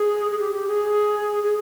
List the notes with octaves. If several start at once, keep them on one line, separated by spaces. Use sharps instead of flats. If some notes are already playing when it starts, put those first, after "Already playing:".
Already playing: G#4
G#4
G4
G4
G#4
G#4